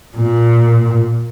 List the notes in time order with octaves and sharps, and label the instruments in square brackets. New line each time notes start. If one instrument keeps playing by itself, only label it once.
[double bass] A#2